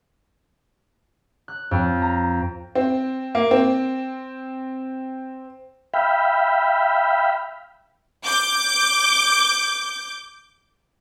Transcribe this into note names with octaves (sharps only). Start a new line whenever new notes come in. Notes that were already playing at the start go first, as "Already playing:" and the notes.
F#6
F2
A#5
C4
A#3
C4
E5 F5 G5 B5
D6 G6